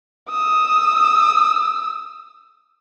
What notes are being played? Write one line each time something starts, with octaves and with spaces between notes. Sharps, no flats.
D#6 E6